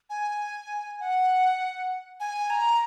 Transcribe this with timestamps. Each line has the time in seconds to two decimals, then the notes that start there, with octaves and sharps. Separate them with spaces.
0.10 G#5
1.00 F#5
2.20 G#5
2.50 A#5